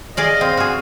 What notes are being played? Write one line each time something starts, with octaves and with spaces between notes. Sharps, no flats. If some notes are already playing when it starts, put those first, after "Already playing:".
G#4 D5 D#5 F5
C4 F5
F#4 G#4